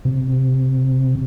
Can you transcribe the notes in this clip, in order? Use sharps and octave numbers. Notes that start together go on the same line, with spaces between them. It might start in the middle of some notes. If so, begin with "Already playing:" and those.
C3